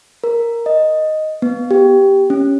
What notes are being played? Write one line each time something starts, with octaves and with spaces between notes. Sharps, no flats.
A#4
D#5
B3
G4
C#4